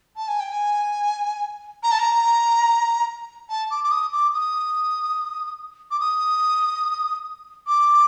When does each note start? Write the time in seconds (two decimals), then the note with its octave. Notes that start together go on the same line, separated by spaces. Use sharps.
0.16 A5
0.28 G#5
0.40 G5
0.52 G#5
1.83 A#5
1.91 A5
1.99 A#5
3.49 A5
3.71 D6
3.84 D6
3.91 D#6
4.12 D6
4.34 D#6
5.91 D6
6.00 D#6
7.67 D6